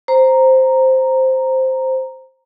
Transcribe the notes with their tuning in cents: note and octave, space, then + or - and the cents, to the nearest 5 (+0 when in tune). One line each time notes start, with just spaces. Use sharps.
C5 +0 A#5 +0